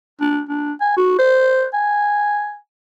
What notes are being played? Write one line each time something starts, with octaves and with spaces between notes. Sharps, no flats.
D4
D4
G#5
F#4
C5
G#5